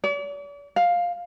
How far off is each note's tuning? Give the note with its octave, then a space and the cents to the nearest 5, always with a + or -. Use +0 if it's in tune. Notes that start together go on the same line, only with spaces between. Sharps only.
D5 -45
F5 +10